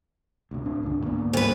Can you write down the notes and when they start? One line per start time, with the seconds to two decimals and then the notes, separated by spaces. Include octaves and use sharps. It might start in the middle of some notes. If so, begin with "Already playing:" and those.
0.51 D2 C3
0.65 A2 C4 D4
0.83 C#2 G#2 D3
1.05 G#2 A#3 B3
1.33 D2 B4